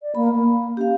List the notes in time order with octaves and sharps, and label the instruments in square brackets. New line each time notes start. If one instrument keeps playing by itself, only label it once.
[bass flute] D5
[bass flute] A#3 [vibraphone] B5
[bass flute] A#3
[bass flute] C#4 [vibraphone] G4 F5